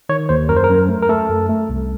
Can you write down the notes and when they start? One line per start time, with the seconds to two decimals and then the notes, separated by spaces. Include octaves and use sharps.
0.09 D#3 C#5
0.29 D#2 C5
0.49 F#2 A#4
0.56 C5
0.64 A#4
0.70 F#2
0.89 A3
1.02 A#4
1.09 A3 A4
1.29 F#2
1.49 A3
1.69 C2